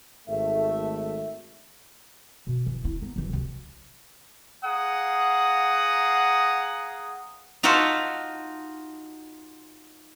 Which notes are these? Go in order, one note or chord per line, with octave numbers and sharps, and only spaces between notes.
G#1 A3 E5
B2
E3
E4
B3 D#4
F#2 E3
D2 C3
G#4 F5 F#5 A#5 D#6
D#4 F4 F#4 E5 F#5 A5